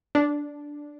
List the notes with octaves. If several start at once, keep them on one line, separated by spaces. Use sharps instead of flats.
D4